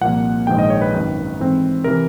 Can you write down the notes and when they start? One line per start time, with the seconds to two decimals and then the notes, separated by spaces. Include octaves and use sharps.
0.01 C2 A#2 F3 A#3 F#5
0.47 A#1 G#2 D#3 G#3 B3 G5
0.58 D#5
0.70 C#5
0.82 B4
0.93 G#1 F#2 D#3
1.39 G#2 E3 A3 C4
1.84 C3 E3 A3 A#4